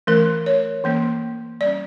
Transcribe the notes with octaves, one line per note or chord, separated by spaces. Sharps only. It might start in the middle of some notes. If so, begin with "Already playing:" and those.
E3 A3 C#4 A#4
C#5
E3 A#3 C#4
G3 D5
C#4